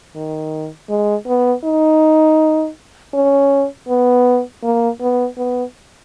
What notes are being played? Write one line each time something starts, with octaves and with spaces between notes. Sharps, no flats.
D#3
G#3
B3
D#4
C#4
B3
A#3
B3
B3